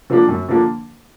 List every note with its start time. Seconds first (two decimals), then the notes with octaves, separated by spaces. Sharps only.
0.10 D3 F3 A#3 D4
0.28 F#2
0.48 D3 F3 A#3 D4